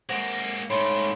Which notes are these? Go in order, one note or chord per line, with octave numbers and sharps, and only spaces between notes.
G#3 A#3 C5 F#5 A#6
G#2 A3 C#5 B5 C6